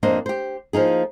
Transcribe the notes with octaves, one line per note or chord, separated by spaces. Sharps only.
F2 A#3 D4 C5 D#5
G4 C5
F3 A#3 D#4 G#4